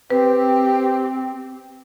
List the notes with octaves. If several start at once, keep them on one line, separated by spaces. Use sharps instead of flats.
C4 G4 B4